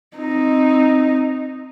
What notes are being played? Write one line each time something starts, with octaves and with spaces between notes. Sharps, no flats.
C4 D#4